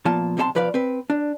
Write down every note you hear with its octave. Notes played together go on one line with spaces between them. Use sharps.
A#2 F3 B3 F4 A5
B1 C3 D#4 F#4 A5 C6
B1 F3 B4 D5 F5
C4 B4
D4